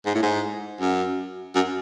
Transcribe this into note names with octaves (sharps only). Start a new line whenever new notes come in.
G#2
A2
G#2
F#2
F#2